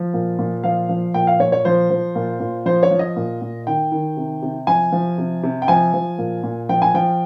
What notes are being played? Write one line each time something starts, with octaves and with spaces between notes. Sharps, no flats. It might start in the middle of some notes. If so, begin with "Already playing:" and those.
Already playing: F3
A#2
A#2
F3 F5
F3
A#2 G5
F5
A#2 C#5
C#5
F3 C5
F3
A#2
A#2
F3 C5
C#5
F3
D#5
A#2
A#2
D#3 G5
D#3
C3
C3
F3 G#5
F3
C3
C3
G5
F3 G#5
F3
A#2
A#2
F3 G5
G#5
F3 G5